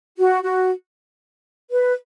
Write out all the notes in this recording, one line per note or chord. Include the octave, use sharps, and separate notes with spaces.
F#4
F#4
B4